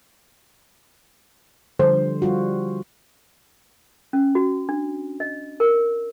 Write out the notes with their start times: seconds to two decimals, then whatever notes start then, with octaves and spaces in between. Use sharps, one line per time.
1.79 D3 F3 G3 C5
2.22 G3 F4 F#4
4.13 C#4
4.35 F#4
4.69 D4
5.20 D#5
5.60 A#4